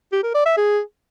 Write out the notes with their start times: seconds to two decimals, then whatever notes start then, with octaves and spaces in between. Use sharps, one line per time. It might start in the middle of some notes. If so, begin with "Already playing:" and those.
0.12 G4
0.23 A#4
0.35 D5
0.46 E5
0.57 G#4